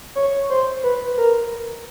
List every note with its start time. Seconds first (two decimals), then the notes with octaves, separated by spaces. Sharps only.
0.15 C#5
0.50 C5
0.83 B4
1.18 A#4